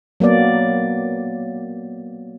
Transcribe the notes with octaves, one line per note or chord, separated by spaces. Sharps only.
F#3 A#3 B3 D5